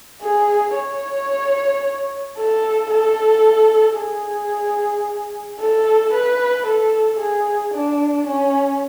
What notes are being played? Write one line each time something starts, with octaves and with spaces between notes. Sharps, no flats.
G#4
C#5
A4
A4
G#4
A4
B4
A4
G#4
D4
C#4